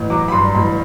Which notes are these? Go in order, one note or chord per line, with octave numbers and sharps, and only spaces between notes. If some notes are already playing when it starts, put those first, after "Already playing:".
Already playing: A1
F#3 D6
B5
G2 C6
A1 B5